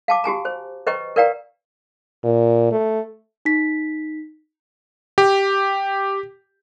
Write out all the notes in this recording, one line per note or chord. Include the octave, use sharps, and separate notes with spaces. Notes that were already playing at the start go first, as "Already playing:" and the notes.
F5 A5 D6
F#4 G4 G#5 A#5
C5
B4 C5 D#5 G5 A#5 C#6
A#4 B4 D5 F5 G5 A#5
A#2
A3
D#4 B6
G4